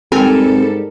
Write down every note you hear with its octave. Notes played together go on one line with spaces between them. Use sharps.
G#2 G3 C4 A4 A#4 G#5